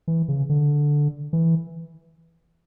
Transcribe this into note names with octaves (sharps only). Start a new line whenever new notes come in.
E3
C#3
D3
E3